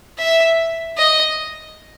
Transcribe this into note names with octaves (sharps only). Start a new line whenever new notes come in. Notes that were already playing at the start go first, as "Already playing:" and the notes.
E5
D#5